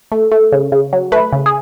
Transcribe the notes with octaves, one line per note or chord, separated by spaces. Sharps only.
A3
A3
C#3
C#3
F#3
A3 B4
C#3
G#4